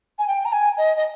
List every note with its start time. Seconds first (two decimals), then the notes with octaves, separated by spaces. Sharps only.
0.19 G#5
0.27 G5
0.45 A#5
0.52 G#5
0.77 D#5
0.97 D#5